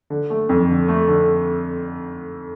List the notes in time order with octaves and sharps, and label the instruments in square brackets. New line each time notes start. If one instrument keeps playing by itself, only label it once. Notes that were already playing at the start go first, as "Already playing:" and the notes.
[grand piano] D3
A3
F2
D3
A3
D3